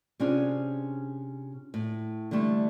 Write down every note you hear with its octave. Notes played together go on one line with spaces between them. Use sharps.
C3 C#4 D4 F4 G#4
A2
D3 E3 G3 A3